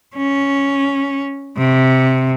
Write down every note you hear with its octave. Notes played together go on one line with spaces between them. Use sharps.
C#4
C3